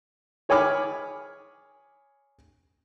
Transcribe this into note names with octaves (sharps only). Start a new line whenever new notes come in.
G#4 C#5 G#5 B5 D6 F6